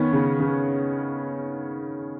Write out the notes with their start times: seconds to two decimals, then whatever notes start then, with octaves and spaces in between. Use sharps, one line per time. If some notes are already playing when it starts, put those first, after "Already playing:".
Already playing: D#3 B3 C#4
0.13 C#3
0.40 C#3